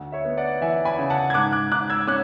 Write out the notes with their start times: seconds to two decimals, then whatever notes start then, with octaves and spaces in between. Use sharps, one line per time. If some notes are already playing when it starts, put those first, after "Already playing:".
Already playing: D2
0.12 C#5 E5
0.25 B3
0.37 D5 F#5
0.61 E3 E5 G#5
0.85 G#5 B5
0.99 C#3
1.10 F#5 A5
1.30 G#6
1.34 G#2 D6 F#6
1.52 D6 F#6
1.72 G#2 D6 F#6
1.90 E6 G#6
2.07 C#4 D6 F#6